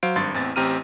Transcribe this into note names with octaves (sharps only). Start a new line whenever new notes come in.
F#3 C5 F5 D7
G#1 G2 C6 A6
A1 E2 C4 A6
A1 C4 G4 A#5 F6 D#7